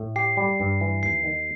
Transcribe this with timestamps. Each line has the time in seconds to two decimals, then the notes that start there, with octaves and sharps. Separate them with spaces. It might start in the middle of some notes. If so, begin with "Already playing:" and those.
Already playing: A2
0.16 G4 C7
0.37 G3
0.60 G2
0.81 E3
1.03 D#2 C7
1.24 D#3